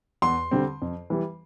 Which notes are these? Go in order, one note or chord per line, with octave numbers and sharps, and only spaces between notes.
E2 C6
D3 G3 C4
F2
E3 G3